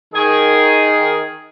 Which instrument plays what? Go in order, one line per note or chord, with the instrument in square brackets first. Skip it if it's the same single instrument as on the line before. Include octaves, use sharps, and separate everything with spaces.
[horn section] D#3 G#4